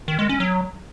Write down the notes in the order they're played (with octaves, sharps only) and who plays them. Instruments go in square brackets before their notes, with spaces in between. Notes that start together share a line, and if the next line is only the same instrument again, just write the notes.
[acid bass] D#3
G#3
C#4
F#3